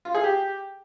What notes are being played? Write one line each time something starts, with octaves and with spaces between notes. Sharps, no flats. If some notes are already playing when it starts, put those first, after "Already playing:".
F4
G#4
G4